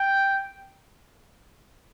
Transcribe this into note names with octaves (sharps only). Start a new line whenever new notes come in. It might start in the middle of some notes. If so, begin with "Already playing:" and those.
Already playing: G5